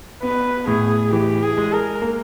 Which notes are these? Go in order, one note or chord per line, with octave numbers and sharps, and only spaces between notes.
B3 B4
A2 G#4
E3 G4
G#4
G#3
A#4
A#3